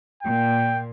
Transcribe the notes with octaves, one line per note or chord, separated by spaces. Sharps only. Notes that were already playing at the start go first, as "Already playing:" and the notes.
A#2 G5